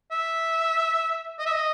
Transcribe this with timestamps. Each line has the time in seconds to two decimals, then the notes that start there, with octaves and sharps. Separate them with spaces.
0.11 E5
1.39 D#5
1.46 E5
1.53 D#5